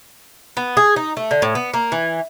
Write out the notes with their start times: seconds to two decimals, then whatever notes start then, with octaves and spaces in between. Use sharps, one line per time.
0.57 B3
0.77 G#4
0.96 D#4
1.17 A3
1.31 D3
1.42 A2
1.55 B3
1.74 A#3
1.92 E3